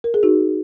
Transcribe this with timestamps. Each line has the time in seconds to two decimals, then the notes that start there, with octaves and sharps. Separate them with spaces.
0.04 A#4
0.14 G#4
0.23 D#4 F#4